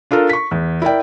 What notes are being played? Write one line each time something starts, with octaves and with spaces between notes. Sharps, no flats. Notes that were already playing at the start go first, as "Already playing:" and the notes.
D4 F4 A4 A#4
C#6 B6
E2
E4 A#4 D5 G5